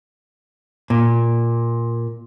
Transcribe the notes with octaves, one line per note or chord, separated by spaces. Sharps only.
A#2